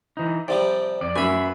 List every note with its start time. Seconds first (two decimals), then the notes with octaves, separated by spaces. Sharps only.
0.17 E3 D#4
0.48 C3 F3 G3 D5
1.01 F2 D5
1.16 F#2 B4 E5 G#5 B5